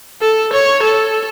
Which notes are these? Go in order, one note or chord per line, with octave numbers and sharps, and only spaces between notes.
A4
C#5
A4